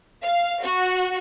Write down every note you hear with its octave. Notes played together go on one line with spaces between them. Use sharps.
F5
F#4